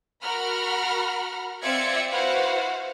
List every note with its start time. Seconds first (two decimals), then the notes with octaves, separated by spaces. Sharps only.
0.21 F#4 A#4 F#5 A#5 B5 F6
1.62 C4 F4 D5 E5 G#6 C#7
2.11 E4 F#4 B4 C5 F5 F#5